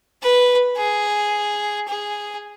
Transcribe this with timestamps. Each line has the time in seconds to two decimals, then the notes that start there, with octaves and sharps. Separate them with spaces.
0.23 B4
0.77 G#4
1.88 G#4